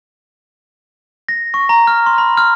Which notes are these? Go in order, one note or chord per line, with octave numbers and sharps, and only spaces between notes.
A#6
C#6
A#5
F6
C6
B5
F6